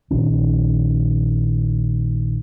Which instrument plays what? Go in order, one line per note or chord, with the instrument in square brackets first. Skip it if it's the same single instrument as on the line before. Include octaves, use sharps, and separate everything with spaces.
[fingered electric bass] A#1 D#3 C#4